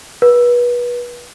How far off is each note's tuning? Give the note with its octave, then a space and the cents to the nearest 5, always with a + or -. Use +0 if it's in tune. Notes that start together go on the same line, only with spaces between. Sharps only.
B4 -30